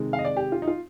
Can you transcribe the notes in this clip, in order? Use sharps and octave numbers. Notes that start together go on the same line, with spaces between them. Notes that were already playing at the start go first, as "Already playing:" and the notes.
Already playing: C3 D#3 G#3
F5
D#5
D5
G4
F4
D#4
F4